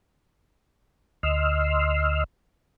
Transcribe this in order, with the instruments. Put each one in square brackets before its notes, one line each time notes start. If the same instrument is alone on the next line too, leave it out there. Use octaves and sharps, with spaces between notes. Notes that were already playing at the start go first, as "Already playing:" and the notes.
[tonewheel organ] D2 D#5 C6 E6 F6